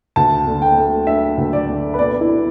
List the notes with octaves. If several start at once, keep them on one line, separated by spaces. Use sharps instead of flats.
D2 A5
D3
G5
A3
D4 E5
D2
D5
D3
B4
B2 D5
E4
B3